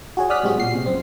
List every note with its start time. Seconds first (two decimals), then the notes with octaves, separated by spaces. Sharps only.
0.17 F#4 G#4 C#5
0.30 D5 D#6 F6 F#6 B6
0.43 A2 G3 G#3 C4 F#4
0.58 A#2 C7
0.75 C3
0.86 F#2 C4